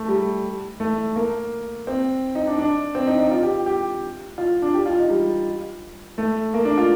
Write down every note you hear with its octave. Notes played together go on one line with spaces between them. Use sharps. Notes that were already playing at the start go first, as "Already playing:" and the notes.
Already playing: A3
G3
A3
A#3
C4
D#4
D4
D4
C4
D#4
D#4
F4
G4
G4
F4
D4
G4
F4
D#4
G3
A3
A#3
D4
F4